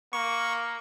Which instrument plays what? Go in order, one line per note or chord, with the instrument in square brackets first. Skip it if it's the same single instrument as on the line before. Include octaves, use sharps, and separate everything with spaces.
[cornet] A#3 [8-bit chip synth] C#6